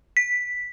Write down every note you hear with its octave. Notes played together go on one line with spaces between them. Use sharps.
B6